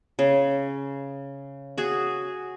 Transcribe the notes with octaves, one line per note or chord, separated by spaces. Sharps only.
C#3
F#4 G#4